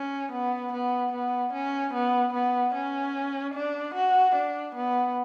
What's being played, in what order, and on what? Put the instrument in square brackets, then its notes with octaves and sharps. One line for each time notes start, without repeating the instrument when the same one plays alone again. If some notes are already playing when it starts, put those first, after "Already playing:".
Already playing: [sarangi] C#4
B3
B3
B3
C#4
B3
B3
C#4
D4
F#4
D4
B3